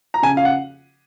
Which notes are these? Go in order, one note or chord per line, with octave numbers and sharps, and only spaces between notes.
A#5
C#3 G#5
F5
F#5